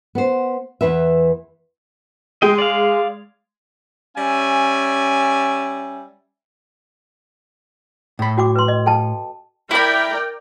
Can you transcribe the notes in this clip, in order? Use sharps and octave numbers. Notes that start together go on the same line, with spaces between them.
B3 C5
E2 C#3 E3 B4 E5
G#3 D#5 G5
D5 F5
G3 C#4 E5 G#5
A2 B5
F#4 G5 D6
B4 C6
D#5
A4 G5 A5
E4 A#4 D5 G5 B5